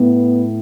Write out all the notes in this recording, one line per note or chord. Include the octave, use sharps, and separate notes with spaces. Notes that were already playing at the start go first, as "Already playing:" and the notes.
Already playing: A2 B3